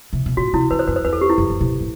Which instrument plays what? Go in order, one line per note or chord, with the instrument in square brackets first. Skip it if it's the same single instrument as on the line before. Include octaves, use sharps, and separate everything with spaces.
[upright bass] C3
B2
[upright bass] A2 [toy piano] F#4
[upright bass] C3 [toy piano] E4
[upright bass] E3 [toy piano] B4
[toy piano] C5
[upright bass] F#2 [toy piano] B4
[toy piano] C5
[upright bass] E2 [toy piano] B4
[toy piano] A4
G4
E4
[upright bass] F#2
F#2
B2
A2